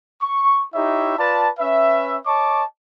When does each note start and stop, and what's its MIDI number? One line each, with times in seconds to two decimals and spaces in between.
0.22 0.64 85
0.74 1.17 63
0.74 1.17 64
0.74 1.17 67
0.74 1.17 73
0.74 1.17 76
1.18 1.49 65
1.18 1.49 71
1.18 1.49 74
1.18 1.49 81
1.59 2.17 61
1.59 2.17 71
1.59 2.17 76
2.26 2.63 73
2.26 2.63 75
2.26 2.63 81
2.26 2.63 85
2.26 2.63 86